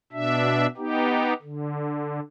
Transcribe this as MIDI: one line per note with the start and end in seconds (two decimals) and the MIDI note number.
0.12 0.66 47
0.12 0.66 62
0.12 0.66 76
0.77 1.33 59
0.77 1.33 63
0.77 1.33 67
1.42 2.20 50